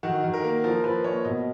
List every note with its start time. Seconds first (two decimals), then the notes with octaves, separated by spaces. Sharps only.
0.03 D#3 F#4
0.23 D#3
0.34 A#4
0.44 A#3
0.64 F3 A#4
0.84 F3 B4
1.04 A#3 C#5
1.25 B2 D#5